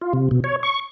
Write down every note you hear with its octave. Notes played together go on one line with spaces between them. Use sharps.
F4
C3
B2
C#5
C#6